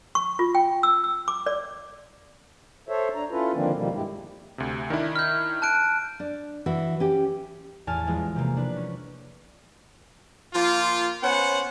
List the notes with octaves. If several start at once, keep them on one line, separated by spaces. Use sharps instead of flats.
C#6
F4
G5
E6
E6
D6
D5
A4 C5 C#5 E5
D4 A#5
C#4 E4 F4 A4 B4
D3 D#3 F3 A#3 C4 D4
B2 D#3 F3 G3 A#3
G2 G#3 E4 G4
D2 C3
D#3 D4 E4
F6 G6
A5 F#6 D7
D4
E3 F#4
C#4 G4
A1 E2 G#5 A5 F6
E3 F3 G3 G#3 B3
C3 A#3
D4 B4
C#4
F3 A#3 F4
B3 C#4 C5 F#5